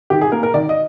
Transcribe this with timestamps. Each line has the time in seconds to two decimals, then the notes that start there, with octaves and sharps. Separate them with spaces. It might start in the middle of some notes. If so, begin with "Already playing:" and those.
0.10 D#3 G4
0.21 G#4
0.32 A#3 A#4
0.43 A#4
0.54 D#3 D5
0.69 D#5